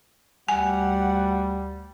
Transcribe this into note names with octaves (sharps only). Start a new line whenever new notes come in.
D2 G3 F#5 G#5